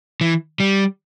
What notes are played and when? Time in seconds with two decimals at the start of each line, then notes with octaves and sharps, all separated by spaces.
0.21 E3
0.60 G3